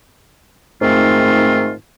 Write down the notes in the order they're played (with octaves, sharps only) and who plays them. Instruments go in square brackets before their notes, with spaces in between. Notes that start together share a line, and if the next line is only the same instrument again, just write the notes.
[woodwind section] G#2 D#3 A3 C4 F4